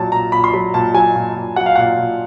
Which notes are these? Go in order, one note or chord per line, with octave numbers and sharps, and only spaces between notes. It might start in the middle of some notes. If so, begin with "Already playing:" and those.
Already playing: A#2 F#3 A5
A#2 A#5
A#2 B5
C6
F#3 B5
A#2 A5
F#3 G#5
A#2
A#2
F#3 F#5
F5
A#2 F#5
A#2